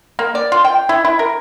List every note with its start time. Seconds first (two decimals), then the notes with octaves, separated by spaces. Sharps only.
0.19 A#3
0.35 D5
0.52 F4
0.65 G5
0.89 E4
1.05 E4
1.19 A#4